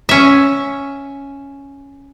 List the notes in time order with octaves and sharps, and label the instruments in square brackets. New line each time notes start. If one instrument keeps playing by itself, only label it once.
[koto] C#4 E5